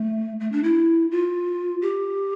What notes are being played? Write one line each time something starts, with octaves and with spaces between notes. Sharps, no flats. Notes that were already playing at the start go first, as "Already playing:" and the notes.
Already playing: A3
A3
D4
E4
F4
G4